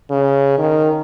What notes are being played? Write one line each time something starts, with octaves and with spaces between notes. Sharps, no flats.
C#3
D#3